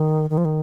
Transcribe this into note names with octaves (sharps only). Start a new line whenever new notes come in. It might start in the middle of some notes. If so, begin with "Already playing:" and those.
Already playing: D#3
D#3
F3
D#3